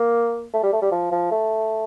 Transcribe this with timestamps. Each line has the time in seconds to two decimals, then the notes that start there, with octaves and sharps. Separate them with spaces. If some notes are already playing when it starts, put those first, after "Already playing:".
Already playing: A#3
0.53 A3
0.63 G3
0.72 A3
0.82 G3
0.92 F3
1.12 F3
1.31 A3